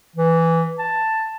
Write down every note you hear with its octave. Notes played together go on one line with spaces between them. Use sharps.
E3
A5